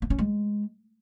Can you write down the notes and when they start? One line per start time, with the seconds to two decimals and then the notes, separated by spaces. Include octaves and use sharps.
0.02 B3
0.10 C#4
0.18 G#3